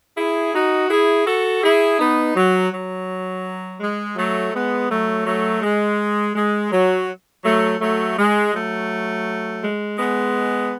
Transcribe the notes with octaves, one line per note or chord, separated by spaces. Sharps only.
E4 G#4
D#4 F#4
E4 G#4
F#4 A4
E4 G#4
B3 D#4
F#3
F#3
G#3
F#3 A3
G#3 B3
F#3 A3
F#3 A3
G#3
G#3
F#3
F#3 A3
F#3 A3
G#3
F#3 A3
G#3
G#3 B3